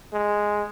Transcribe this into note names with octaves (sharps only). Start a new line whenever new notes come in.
G#3